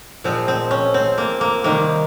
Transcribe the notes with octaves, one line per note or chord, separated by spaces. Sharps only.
A#2 F3 G#3 C4
C4
C#4
C4
A#3
A#3
C3 D#3 G3 A#3